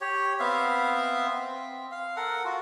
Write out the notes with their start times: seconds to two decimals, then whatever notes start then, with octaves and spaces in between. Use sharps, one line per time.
0.01 G4 C#5
0.39 B3 C4 E5 F5
1.30 C4
1.91 F5
2.16 A4 A#4 F#5
2.45 F4 F#4